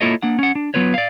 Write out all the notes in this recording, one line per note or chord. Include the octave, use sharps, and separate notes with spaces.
A#3 E4 F4 A4 C#5 D#5
A#3 D4 F#5
C#4 F#5
D4
F#3 B3 F4 B4 C#5
D5 F5